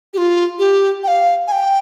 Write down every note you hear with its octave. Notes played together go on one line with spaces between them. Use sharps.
G4
F4
G4
G5
F5
G#5
G5